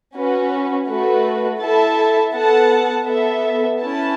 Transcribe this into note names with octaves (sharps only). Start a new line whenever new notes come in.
C#4 F#4 B4
A3 F#4 B4
E4 A4 E5 A5
B3 A4 F#5 A5
B3 A4 E5
C#4 E4 B4 A5